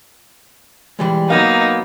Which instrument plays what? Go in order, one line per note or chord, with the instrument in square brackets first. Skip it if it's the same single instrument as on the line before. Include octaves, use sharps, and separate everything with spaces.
[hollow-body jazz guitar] E3 G3 G#3
[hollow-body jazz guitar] F#3 B3 F5 [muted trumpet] A#3 [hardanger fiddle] D#4